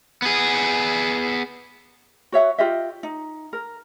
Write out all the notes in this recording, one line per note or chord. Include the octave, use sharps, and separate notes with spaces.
B3 G#4
F#4 C#5 E5 F#5
F4 G4 D#5 E5
D#4
A#4